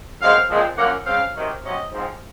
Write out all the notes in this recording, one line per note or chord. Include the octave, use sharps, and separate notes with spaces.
F#2 C#3 G#3 C4 F5
A#2 F3 G#3 C4
F#2 F3 A#3 C#4 F#5
C#3 G#3 C4 F5
C3 D#3 F#3
C3 F#3 C#4 D#5
G#2 F3 C4